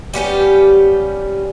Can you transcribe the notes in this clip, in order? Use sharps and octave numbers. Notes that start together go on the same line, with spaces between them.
G3 B3 C#4 G4